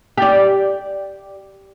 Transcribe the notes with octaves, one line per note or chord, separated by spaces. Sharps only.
G4 D5